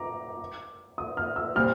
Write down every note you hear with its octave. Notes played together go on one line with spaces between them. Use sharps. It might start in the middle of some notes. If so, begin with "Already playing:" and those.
Already playing: A#5 D6
D#6
F6
E6
A#2 G3 C4 F6